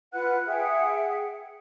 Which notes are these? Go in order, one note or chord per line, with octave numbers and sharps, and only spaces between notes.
F4 B4 F#5 F#6
G#4 E5 F#5 G5